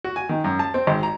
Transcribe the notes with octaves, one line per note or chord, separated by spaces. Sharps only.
F#4
G#5
D#3
F#2
A5
C4
G#1
A#5